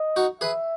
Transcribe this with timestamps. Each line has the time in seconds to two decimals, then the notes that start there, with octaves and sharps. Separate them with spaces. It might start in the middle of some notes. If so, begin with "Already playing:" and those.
Already playing: D#5
0.16 D#4 F#4
0.41 G#4 B4 E5